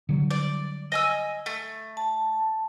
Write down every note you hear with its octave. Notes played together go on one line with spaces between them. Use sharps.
D3 F#3 G3
D5
D#5 G#5 E6
A3
A5